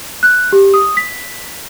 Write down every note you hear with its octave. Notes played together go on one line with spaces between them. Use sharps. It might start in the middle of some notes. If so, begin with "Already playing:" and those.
F#6
G4
D#6
B6